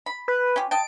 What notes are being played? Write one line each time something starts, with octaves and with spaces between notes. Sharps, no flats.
B5
B4
C#4 F4 G4
D#5 G5 A5 D7